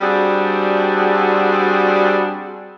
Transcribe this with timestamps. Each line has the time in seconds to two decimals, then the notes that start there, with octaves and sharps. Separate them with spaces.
0.01 G3 C4 D4 F#4 G#4